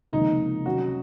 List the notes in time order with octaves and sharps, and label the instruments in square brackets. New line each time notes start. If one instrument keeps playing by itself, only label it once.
[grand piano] C#2 C3 F3 A#3 [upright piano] D#4
[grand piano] C3 F#3 C#4 [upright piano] F#4